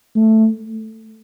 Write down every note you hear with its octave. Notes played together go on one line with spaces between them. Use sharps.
A3